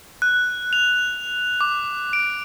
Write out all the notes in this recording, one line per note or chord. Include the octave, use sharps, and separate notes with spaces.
F#6
F7
D6
D7